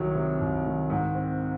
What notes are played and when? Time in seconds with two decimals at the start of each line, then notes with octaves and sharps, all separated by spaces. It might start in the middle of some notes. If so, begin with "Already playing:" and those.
Already playing: C2 D#3 F#3
0.15 C3
0.41 C2
0.65 D#3
0.90 G#2
1.15 C4